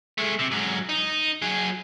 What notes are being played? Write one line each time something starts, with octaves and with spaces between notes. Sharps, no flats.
G#3 A3
C3
G#2 F#3
D#4
F#3 G#4